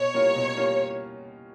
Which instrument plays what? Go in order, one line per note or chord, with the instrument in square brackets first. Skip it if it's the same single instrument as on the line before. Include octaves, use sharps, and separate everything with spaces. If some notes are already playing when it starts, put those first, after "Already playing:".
Already playing: [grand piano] B2 [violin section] C#5
[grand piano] G3 A#3 C#4 F4
B2
G3 A#3 C#4 F4